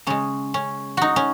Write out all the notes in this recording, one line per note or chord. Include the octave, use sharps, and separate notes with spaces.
C#3 G#3 C#4
C#4
D#4 F#4
C#4